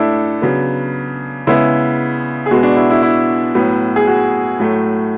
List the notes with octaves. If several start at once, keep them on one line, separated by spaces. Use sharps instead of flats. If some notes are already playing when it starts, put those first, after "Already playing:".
Already playing: A2 A3 D4 E4 A4
C#3 F#3 B3
C#3 G#3 B3 E4
G#4
B2 G#3 B3 F#4
D4
E4
E4
E4
A2 F#3 B3
G#4
F#4
A2 F#3 A3